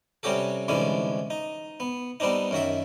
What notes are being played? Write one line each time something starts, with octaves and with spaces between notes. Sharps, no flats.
C3 G3 C#4 F#4 G4 A4
C2 G#2 D3 E3 C#4 D5
D#4
B3
G3 B3 C4 D4 D#4
F#2 D#3 F#4 E5